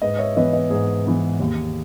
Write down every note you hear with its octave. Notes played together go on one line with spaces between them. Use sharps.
G#2 B4 D#5
C#5 E5
E3 B3 B4 D#5
B4 D#5
G#2 G#4
E3 B3
D#2